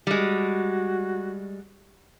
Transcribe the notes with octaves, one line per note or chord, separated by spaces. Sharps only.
G3 G#3 F#4